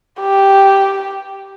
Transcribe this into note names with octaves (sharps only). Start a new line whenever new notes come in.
G4